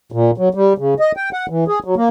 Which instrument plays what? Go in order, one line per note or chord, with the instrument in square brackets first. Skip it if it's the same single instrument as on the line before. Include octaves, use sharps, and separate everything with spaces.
[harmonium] A#2
F#3
G3
C#3
D#5
G5
F#5
E3
G#4
F#3
A#3